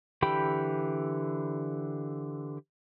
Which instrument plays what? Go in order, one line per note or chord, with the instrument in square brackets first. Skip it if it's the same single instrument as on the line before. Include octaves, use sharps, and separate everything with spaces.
[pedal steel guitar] D3 E3 G4 G5 B5